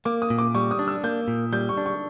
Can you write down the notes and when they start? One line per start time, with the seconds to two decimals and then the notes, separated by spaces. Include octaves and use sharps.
0.05 A#3 D6
0.22 D#6
0.30 A#2
0.38 D6
0.55 G3 C#6
0.71 D#6
0.79 D4
0.88 E6
1.04 A#3 G6
1.28 A#2
1.53 G3 G6
1.69 C#6
1.77 D4
1.86 C#6